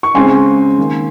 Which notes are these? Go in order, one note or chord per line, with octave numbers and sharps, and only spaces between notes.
C#6
C#3 G#3 C4 G#5 C6
D#3 A#3